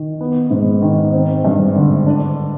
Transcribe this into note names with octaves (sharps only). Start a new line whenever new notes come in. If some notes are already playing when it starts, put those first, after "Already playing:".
Already playing: D#3
B3
G#2
D#3
C4
G2
D3
D4